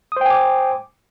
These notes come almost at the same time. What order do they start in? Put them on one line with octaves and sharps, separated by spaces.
D#6 C5 G5 G#5 D6